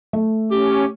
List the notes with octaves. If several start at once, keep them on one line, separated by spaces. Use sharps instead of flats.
A3
C#4 G4